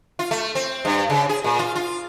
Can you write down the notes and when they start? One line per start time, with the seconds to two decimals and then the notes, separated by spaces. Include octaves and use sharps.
0.19 F4
0.31 A3
0.55 C4
0.85 G2
1.10 C#3
1.29 G#4
1.44 A#2
1.59 F4
1.75 F4